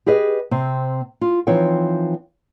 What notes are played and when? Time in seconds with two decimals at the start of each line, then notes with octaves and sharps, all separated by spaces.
0.06 G4 G#4 B4 D#5
0.51 C3 C4
1.21 F4
1.47 E3 F3 C4 D#4 C#5 G5